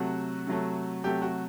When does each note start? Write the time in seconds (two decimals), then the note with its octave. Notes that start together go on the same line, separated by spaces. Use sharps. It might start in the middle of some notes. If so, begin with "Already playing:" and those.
Already playing: C3 F#3 A3 F#4
0.47 C3 F#3 A3
1.04 C3 F#3 A3 G4
1.22 F#4